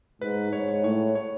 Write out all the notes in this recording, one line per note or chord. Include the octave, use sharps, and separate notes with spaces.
G#2 B4
G#2 C#5
C#5
A2 C#5
C#5